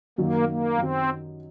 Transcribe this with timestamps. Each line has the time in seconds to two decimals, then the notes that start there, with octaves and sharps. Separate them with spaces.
0.18 F#2 D#3 F#3 A#3
0.48 A#3
0.78 F#2 D#3 F#3 C4